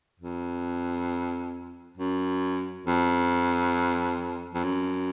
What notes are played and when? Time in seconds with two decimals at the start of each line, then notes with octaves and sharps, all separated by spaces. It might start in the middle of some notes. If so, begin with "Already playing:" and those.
0.20 F2
1.97 F#2
2.86 F2
4.54 F2
4.64 F#2